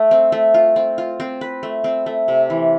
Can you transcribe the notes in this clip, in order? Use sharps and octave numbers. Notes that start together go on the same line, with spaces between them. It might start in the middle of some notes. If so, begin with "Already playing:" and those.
Already playing: A3
C4
A3
F4
C4
F4
C4
B4
A3
C4
A3
C3
E3